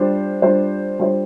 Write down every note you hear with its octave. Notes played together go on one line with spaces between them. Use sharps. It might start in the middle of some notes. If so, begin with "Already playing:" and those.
Already playing: G3 D4 F4 C5
G3 D4 F4 C5
G3 D4 F4 C5